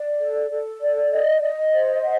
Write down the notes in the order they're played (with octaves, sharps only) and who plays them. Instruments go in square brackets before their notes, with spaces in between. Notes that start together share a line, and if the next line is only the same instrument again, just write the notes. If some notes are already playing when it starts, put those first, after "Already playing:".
Already playing: [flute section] D5
A4
A4
D5
D#5
D#5
C5
F#5